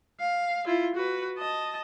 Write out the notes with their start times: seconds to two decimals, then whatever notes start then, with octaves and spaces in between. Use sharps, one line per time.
0.20 F5
0.66 E4 F4
0.95 F#4 B4
1.38 D#5 A5